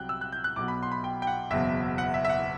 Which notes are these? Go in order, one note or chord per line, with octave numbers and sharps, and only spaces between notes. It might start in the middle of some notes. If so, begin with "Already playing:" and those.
Already playing: C2 C3 F#3 G5 F#6
E6
F#6
G6
F#6
B1 B2 F#3 D6
B5
C6
B5
G5
G5
F#5
F#1 E2 B2 F#3 E5
F#5
E5
E5
F#5